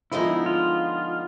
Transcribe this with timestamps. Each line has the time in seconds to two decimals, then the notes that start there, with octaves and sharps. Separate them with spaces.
0.12 D3 F3 G#3 B3 D#4 E4
0.46 F4